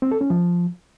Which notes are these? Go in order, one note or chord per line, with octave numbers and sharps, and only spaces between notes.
C4
A4
C#4
F3